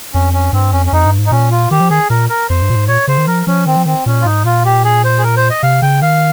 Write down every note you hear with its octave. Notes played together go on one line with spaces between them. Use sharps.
F2 C#4
C#4
G2 C4
F2 C#4
C#4
F2 D#4
G2
G#2
D#4
A#2 C#4
F4
D#3 G4
F3
D#3 G#4
A#2 A#4
A#4
F2 C5
G2
A#2
G#2
A#2 C#5
C#3 C5
D#3
F3 A#4
F3 C#4
D#3 C4
F3
D#3 C4
A#2 C#4
F4
G#2 D#4
A#2 F4
G4
G#4
C5
G#4
A#4
C5
D#5
C3 F5
C#3 G5
D#3 F5